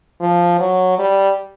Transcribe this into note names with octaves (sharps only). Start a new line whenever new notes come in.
F3
F#3
G3